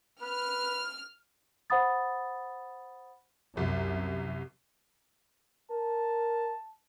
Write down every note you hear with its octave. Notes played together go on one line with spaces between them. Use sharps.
B4 F6
C5 F#5 B5 D#6 A6
C2 F#2
A#4 A5